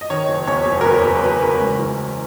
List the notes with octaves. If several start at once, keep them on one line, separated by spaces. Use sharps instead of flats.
D#5
D#3 C#5
F#1
E2 C#5
F#1
A#4
E2 B4
F#1 C#5
F#1 B4
F#1 A#4
C#2
E3